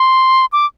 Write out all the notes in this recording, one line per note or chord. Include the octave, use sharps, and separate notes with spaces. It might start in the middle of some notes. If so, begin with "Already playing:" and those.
Already playing: C6
D6